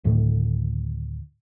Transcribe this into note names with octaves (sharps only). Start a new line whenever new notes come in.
D2 A2 D3 D#3